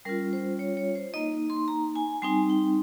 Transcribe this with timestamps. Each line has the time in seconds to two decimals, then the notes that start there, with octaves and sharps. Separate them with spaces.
0.05 G3 C#4 F4 A#4
0.33 C5
0.59 C#5
0.77 C#5
0.95 C5
1.14 A#3 D#4 D#5
1.50 C6
1.68 A#5
1.96 G#5
2.22 G3 C4 D#4 G#5
2.50 G5